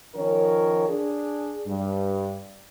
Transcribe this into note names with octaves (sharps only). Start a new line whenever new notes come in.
D#3 F3 C#4 A#4 C#5
D4 G#4
G2